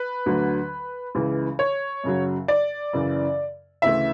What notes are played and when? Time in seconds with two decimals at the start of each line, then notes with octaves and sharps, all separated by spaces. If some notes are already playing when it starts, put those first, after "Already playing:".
Already playing: B4
0.26 D2 D3 F#3
1.15 C#2 C#3 E3
1.59 C#5
2.04 F#2 C#3 F#3
2.48 D5
2.93 F#2 C#3 E3
3.82 D2 C#3 E3 E5